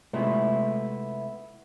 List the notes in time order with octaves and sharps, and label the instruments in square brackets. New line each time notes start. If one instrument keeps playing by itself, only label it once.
[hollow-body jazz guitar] C3 G#3 A3 B3 E4 F4